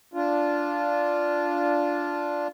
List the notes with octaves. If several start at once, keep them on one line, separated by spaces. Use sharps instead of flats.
D4 F4